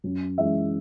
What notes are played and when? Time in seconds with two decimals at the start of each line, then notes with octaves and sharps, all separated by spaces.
0.04 F#2
0.38 E3 G#3 C#4 E5